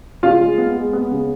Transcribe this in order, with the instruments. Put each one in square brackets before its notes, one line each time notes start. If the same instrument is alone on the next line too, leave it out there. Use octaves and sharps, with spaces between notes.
[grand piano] C#3 F4 F5
G#3
B3
G#3
B3
C#3